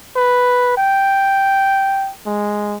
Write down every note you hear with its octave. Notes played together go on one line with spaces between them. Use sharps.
B4
G5
G#3